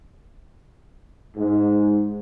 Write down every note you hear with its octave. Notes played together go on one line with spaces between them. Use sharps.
G#2